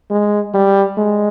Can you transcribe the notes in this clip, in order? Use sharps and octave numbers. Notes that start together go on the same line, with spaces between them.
G#3
G3
G#3